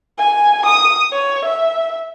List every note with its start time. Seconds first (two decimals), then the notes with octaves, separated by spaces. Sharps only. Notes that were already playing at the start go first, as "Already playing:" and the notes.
0.18 G#5
0.65 D#6
1.12 C#5
1.45 E5